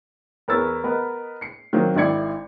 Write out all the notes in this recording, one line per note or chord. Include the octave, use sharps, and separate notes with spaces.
E2 A#4 B4 C#5 E6 A6
B3 A#4 B4 D#5
C7 C#7
D#3 F#3 A#3 C4
G#1 D#3 E4 D5 G#6 C#7